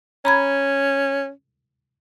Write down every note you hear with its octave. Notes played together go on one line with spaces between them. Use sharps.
C#4 A#5 B5 G#6